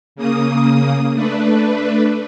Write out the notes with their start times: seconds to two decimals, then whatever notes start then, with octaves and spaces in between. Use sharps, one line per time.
0.16 C#3 A#3 D#6
1.14 A3 D4 B4